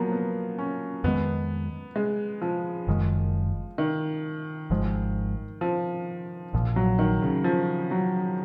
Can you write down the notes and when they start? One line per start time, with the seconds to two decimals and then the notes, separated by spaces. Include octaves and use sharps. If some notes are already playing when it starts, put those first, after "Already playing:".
Already playing: F3 F#3 A#3 B3
0.12 B3
0.58 C#4
1.04 F2 D#3 G#3 B3
1.96 G#3
2.42 F3
2.87 F#1 F#2 D#3 G#3
3.78 D#3
4.70 G#1 G#2 F3 G#3
5.61 F3
6.53 A#1 A#2 F3
6.76 F#3
6.99 D#3
7.22 C#3
7.44 F3
7.91 F#3